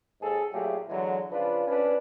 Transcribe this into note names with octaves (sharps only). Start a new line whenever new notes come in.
D#2 G#2 G#4 A4
A#2 F#3 A3 E4 G4 G#4
D3 E3 F#3 G#3
C#3 F3 D4 F4 B4
F2 C#4 D4 B4